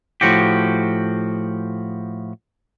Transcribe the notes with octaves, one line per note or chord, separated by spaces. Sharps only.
A2 F3 F#4 G4